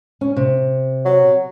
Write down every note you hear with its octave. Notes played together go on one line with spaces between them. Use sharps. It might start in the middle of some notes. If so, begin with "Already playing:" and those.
C#4
C3
F#3